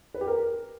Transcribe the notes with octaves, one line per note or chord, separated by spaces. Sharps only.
B4
G4
A#4